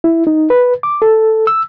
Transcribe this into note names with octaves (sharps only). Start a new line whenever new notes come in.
E4
D#4
B4
D6
A4
E6